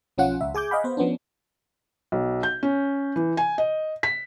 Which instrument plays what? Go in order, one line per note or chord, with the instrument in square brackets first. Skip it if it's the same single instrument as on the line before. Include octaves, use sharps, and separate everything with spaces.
[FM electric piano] B1 F3 C#4 F4 F#5
C#2 E5
G#4 G#5 D6 G6
D#5 F5 F#5 B5
B3 C5
F3 B3 C#4 D4
[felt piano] B1
G6
C#4
E3
G#5
D#5
B6